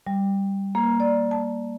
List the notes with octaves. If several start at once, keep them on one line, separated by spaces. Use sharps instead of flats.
G3
A#3
D5
A5